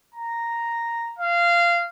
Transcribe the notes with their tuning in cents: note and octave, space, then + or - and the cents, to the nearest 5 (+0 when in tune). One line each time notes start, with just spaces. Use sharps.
A#5 -5
F5 -15